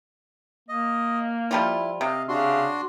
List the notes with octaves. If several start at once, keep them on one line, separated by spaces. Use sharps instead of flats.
A#3 D#5
F3 G3 E4 F4
C3 D#5 F5
C#3 D4 F#4 C6